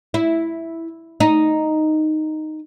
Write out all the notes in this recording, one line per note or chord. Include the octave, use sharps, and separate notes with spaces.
E4
D#4